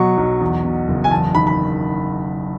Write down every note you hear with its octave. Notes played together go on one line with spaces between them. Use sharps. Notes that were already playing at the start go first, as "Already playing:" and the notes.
Already playing: B2 F#3 C#6
B1
E2
B2
F#1
G#5
E2 A5
D#3 B5
B5